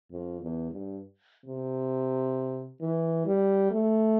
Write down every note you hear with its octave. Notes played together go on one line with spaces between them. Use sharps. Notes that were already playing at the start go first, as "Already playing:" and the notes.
F2
E2
G2
C3
E3
G3
A3